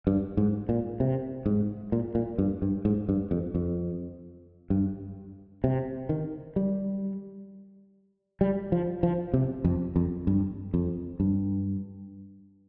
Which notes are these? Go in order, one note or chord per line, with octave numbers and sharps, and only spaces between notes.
G2
G#2
A#2
C3
G#2
A#2
A#2
G2
G2
G#2
G2
F2
F2
G2
C3
D#3
G3
G3
F3
F3
C3
F2
F2
G2
F2
G2